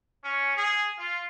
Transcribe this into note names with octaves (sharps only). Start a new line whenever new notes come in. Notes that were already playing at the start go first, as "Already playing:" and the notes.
C#4
G#4
F4